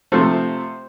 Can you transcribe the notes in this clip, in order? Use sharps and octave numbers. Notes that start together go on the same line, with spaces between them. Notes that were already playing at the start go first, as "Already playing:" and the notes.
C3 F3 A3 C5